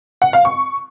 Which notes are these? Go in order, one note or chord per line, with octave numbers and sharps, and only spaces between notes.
F#5
F5
C#6